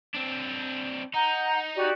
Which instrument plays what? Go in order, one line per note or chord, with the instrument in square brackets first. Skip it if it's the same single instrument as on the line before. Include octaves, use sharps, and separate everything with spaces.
[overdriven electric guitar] C4 D4
[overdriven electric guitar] D#4 [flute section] F#5 A#5 G6
[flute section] F#4 G4 D5